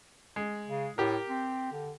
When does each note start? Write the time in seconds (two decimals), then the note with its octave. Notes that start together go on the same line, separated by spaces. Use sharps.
0.36 G#3
0.67 C#3
0.98 A2 G4 A#4
1.29 C4
1.72 D3